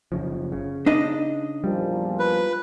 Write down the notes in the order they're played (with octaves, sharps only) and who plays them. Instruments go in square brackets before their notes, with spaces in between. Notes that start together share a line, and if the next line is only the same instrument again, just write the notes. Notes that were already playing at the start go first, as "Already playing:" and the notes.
[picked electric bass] F#1 C#3 F3
C#3
[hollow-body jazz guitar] D4 D#4 D#5
[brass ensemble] E2 A#2 F3 [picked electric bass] G3
[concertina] B4